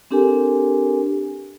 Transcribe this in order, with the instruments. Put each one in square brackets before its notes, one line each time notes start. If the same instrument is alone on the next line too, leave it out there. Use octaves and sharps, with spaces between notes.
[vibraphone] C4 D4 G4 A4 A#4 G#5